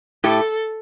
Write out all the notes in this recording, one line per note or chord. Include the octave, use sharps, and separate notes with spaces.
A2 A3 G4 A4